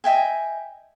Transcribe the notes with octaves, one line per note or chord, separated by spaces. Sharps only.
D#5 E5 G5 G#5